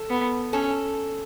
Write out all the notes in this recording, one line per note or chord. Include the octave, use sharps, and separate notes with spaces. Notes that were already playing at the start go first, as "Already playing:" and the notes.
Already playing: A4
B3
C#4 A4